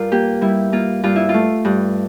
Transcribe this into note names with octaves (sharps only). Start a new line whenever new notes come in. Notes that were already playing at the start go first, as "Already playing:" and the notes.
Already playing: G2 F4 A#4
A#3 G4
G3 E4
A#3 F4
G2 F4
E4
F4
A3
G2